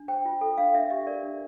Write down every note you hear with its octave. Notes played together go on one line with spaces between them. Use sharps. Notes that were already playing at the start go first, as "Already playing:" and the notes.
Already playing: D4
C5 G5
F4
A4 G5
D4 F5
D4 E5
G4 E5
A#4 D5
D4